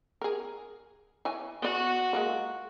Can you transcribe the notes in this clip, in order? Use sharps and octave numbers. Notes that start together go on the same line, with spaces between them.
G#4 A#4
E3 C#5 G#5
B3 F#4 D5
G#3 A#3 F4